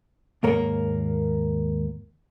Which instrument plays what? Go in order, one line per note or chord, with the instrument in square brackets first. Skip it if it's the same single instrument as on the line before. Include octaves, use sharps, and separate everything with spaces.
[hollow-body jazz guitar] D#2 G#2 A#3 A#4 C#5